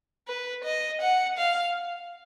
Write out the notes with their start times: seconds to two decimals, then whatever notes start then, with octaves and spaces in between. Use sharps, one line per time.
0.28 B4
0.65 D#5
1.01 F#5
1.37 F5